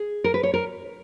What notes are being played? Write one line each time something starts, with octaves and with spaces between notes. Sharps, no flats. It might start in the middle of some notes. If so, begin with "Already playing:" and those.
Already playing: G#4
A#4
B4
C#5
A#4